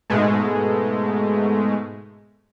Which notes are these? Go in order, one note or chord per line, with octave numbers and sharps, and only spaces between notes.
G#2 B2 G#3 A3